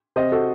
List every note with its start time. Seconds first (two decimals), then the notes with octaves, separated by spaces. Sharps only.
0.16 C3 C5 D#5
0.32 F#4 A4